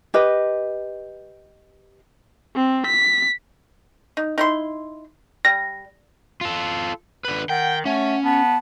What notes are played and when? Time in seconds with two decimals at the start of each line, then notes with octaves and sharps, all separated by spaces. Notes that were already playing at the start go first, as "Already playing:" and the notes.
0.14 G4 B4 D#5
2.56 C4
2.87 B6
4.17 D#4
4.38 D#4 E4 C6
5.45 G3 A#6
6.41 F4 A4
7.25 D3 B4
7.49 D#3 F#5 G5
7.86 A3 C#4 F#5
8.24 B3 A5